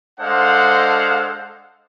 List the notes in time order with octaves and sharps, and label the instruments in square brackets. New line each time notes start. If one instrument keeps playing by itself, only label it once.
[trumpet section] G#3 D4 A4 C5 F5 F#5